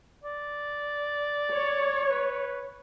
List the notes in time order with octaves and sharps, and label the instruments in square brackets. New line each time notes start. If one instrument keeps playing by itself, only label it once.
[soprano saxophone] D5
[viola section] C#5
[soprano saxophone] B4